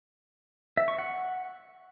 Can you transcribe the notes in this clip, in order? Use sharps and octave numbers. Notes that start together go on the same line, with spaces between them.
E5
C#6
F#5